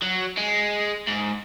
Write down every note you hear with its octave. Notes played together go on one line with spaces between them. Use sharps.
F#3
G#3
G#2